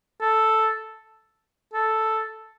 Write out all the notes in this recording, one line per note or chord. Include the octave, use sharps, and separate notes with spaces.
A4
A4